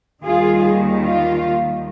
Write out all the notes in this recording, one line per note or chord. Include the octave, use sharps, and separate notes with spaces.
D#2 D#3 G3 F4 G#4
F4